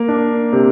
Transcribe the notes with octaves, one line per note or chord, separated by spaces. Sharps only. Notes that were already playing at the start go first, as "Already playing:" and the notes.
Already playing: A#3 A#4
D4
C3